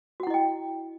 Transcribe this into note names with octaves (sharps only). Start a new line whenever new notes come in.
E4 F#4 D#5 F#5 G5